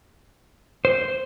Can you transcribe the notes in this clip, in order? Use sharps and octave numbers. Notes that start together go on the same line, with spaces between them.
C5